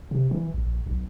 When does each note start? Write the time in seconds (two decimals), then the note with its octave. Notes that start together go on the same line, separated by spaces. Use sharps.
0.11 C3
0.31 E3
0.54 A#1
0.86 B1